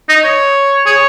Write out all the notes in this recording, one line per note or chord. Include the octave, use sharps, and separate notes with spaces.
D#4 D#5
C#5
G#4 C#5